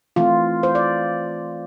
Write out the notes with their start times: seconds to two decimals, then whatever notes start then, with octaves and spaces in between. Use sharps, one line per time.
0.16 E3 A3 C4 F4
0.63 C5
0.75 D5